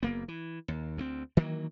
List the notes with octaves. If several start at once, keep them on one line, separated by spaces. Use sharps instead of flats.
F#1 A#3 B3
E3
D#2
D2 E3 C4
D#3 E3 F#3 A#3